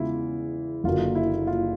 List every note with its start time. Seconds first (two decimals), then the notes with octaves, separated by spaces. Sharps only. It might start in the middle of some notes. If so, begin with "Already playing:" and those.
Already playing: E2 C#3 E3 G#3 E4 F4
0.84 F#1 F#2 D3 F#3 A#3 F4
1.15 E4
1.47 F4